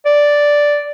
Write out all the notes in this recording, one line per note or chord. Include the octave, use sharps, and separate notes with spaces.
D5